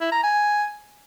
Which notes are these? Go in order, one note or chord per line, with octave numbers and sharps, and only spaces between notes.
E4
A#5
G#5